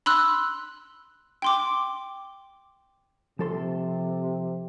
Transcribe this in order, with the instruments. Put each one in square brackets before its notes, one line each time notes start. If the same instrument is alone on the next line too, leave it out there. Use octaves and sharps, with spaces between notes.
[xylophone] B5 C6 E6 F#6
G5 C6 D6
[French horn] C3 [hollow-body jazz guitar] F3 A4 C6